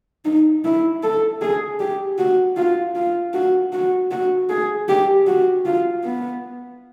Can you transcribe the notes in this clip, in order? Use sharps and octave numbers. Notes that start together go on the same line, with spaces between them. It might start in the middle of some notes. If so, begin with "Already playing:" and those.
D#4
E4
A4
G#4
G4
F#4
F4
F4
F#4
F#4
F#4
G#4
G4
F#4
F4
B3